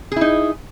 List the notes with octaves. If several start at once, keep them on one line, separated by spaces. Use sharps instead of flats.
D#4 E4 G#4